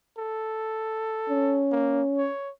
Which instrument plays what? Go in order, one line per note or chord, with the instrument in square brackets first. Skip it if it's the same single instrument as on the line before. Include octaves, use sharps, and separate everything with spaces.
[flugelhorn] A4
[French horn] C#4
[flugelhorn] A#3
C#5